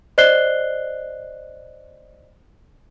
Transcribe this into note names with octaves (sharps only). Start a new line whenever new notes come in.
C5 D5 D#5 F#6 C7 G7